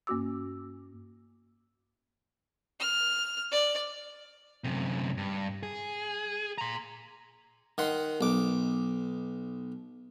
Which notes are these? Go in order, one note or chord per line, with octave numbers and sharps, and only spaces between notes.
G2 A#3 C#4 F#4 D6 E6
F6
D5
F#2 C3
G2
G#4
A#5 C6
D#3 F#5 C6
B1 D6